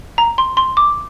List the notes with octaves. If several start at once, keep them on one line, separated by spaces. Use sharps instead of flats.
A#5
C6
C6
D6